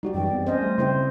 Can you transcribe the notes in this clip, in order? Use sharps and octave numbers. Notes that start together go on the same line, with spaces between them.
G3 G#3 D#4 F#4 G4 D5
F#2 E3 G5
B3 C4
C#4 C5 D#5
G3 A3
C#3 C4 E4 C5 G5 C6